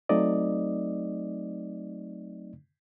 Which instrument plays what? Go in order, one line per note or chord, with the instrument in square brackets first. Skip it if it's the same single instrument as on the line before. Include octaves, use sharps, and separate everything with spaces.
[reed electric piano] F#3 A3 C4 D#4 D5 D#5